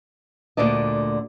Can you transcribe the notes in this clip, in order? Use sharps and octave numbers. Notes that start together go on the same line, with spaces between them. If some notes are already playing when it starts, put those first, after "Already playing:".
D2 A#2 D3 A3 D4 D#5